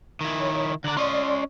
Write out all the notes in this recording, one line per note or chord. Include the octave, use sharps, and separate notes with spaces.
D#3 E4
C#5 B5
D3 D5 A#5 F#6
C#4 D5 D#5 C6